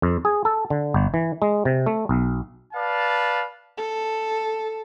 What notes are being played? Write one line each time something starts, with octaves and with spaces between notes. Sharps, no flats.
F2
G#4
A4
D3
G1
E3
G#3
C3
A3
B1
B4 D5 F5 A5
A4